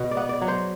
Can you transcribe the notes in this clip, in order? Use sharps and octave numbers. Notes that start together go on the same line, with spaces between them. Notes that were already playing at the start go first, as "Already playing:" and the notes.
Already playing: B2
D5
B3
D5
F#3
C5